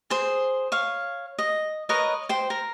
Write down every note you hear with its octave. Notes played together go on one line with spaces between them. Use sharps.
G#4 C5
C#5 F5
D#5
A#4 B4 C#5 D#5
C5 G5
A#4